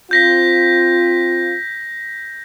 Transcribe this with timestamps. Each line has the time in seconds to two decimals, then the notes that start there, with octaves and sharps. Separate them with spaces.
0.11 C4 F4 G6 A#6 B6